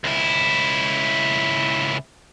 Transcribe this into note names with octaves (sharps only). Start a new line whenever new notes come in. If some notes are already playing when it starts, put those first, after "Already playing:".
C#2 E4